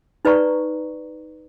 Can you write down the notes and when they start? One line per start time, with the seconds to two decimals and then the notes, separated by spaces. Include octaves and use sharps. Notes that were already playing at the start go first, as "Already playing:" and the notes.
0.25 D#4 B4 D5 A#5 C#6